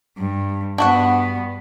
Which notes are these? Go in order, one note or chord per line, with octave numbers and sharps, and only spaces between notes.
G2
G2 B3 D4 F#4 F#5